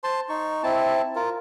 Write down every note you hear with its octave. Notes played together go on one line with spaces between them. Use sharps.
C5 A5 C6
D#4 C#6
C4 E4 A5
F4 A#4